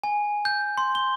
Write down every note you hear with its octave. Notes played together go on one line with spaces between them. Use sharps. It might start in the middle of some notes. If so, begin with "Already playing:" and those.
G#5
G6
C6
G7